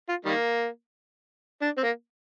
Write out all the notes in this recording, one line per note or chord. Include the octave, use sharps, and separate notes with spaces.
F4
D#3 G3 A#3
D4
C4
A#3